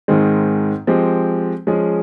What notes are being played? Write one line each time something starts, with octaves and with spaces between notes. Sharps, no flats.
G#2 D#3 G#3 C4
F3 G#3 C4 G4
F3 G#3 C#4 G#4